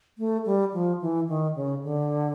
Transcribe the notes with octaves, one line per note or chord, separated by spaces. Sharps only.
A3
G3
F3
E3
D#3
C#3
D3